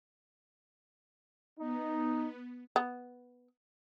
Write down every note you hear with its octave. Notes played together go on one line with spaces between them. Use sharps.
B3 D#4
B3